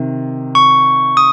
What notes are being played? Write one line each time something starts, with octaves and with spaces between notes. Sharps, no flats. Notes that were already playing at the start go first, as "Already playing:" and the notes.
Already playing: C3 D#3
C#6
D#6